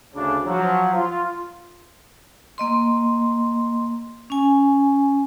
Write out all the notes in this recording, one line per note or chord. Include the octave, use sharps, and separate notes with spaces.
D2 C#3 D4
F3 F#3
F4
A#3 D#5 C6
C#4 G#5